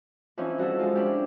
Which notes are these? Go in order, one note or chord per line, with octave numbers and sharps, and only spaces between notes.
E3 F3 C4 C#4 D#4
G2 F#4 G#4 A4 E5
F3 G#3 F4
C#4 D4 E4 G4